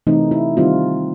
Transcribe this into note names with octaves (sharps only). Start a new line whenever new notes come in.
C3 E3 A3 C4 D#4
E4
D#3 G3 C4 D#4 F4